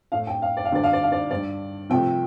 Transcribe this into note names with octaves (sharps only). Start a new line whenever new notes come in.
A2 A3 F5
G5
F5
D5
F5
D2 D3 G3 D5
F5
D5
F5
D5
G2 G3 D5
C2 C3 F3 A3 G5